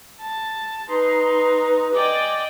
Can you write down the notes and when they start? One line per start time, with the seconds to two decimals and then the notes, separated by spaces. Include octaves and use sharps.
0.20 A5
0.89 D#4 B4 C6
1.94 D5 D#5 G5 G#5 D6